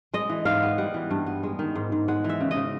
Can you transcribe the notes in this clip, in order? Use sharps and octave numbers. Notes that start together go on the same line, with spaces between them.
G#3 D#5
E3
G#2 F5
B3
G3 F#5
E3
G2
B3
G#3
D#3
G#2
G#2
G#3 F#5
E3 E5
C#3
D#5
C#3